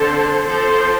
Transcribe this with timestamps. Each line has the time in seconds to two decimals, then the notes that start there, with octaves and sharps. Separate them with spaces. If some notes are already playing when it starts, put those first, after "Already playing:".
Already playing: D3 A3 C4 A4 C5
0.46 F3 C4 A4 C5